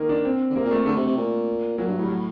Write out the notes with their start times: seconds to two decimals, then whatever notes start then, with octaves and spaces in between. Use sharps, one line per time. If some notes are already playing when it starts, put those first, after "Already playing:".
Already playing: D#3 A#3
0.09 D4
0.25 C4
0.50 D3
0.55 C3 A#3
0.65 A#2
0.71 A3
0.86 D3 A3
0.96 C3
1.07 C3
1.17 A#2
1.78 A#2 F#3
1.88 G2
1.98 A2 G3
2.09 F#3